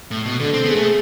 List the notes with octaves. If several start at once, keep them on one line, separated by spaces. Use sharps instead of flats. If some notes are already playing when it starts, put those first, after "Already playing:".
A2
B2
D3 A4
C4
B3 G#4
A3